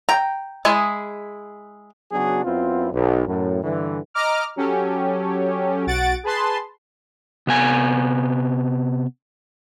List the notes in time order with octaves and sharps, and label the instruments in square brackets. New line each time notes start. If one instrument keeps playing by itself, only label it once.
[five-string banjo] G5 A#5
G#3 E4 G#4
[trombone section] C#3 F#3 B3 D4 F#4 G#4
F#2 B3 C4 E4 F4
B1
F#2 A2
G2 D3 E3
[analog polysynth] D#5 A#5 D6 F6
F#3 C#4 G4 A4
B1 F#4 F#5 A6 D7
G#4 B4 A5 C6
[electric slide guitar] C3 B3 G#5